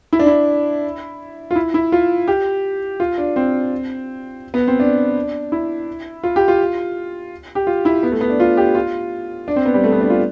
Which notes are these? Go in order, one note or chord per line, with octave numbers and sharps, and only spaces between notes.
E4
D4
E4
F4
E4
E4
F4
G4
F4
D4
C4
B3
C4
D4
E4
F4
G4
F4
G4
F4
E4
B3
A3
B3
D4
F4
G4
F4
D4
C4
B3
G3
A3
B3
D4
F4